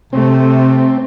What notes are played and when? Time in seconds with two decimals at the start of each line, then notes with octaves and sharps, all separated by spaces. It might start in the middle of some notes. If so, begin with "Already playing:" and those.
0.13 C3 A3 C4